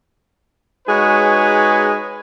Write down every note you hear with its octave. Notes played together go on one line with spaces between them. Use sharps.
G#3 D#4 F#4 G#4 B4 C#5